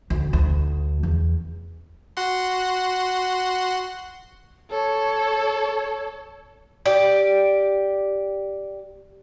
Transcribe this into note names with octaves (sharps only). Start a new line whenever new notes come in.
D2
D2
E2
F#4 F#5 C6
A4 C#5
G4 D5